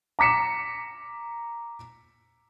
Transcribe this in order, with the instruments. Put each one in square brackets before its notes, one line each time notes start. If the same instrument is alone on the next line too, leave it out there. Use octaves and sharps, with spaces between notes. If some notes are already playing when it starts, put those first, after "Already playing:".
[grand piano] A#5 D6 B6 C#7 E7